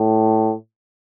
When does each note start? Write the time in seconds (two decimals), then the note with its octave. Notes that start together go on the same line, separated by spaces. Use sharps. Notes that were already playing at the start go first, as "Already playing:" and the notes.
Already playing: A2